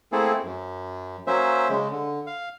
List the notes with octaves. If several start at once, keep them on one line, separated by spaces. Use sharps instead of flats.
A3 A#3 C4 E4 G#4 A4
F#2
F#3 A#3 C#4 C5 E5
C#3 G#3
D3
F5